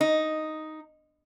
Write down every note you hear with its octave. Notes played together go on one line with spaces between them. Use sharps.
D#4